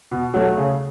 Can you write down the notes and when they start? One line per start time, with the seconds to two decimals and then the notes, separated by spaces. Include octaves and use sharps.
0.11 B2
0.34 F#3 A3
0.57 C#3